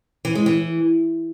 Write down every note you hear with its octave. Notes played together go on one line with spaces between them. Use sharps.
E3
G#3
E3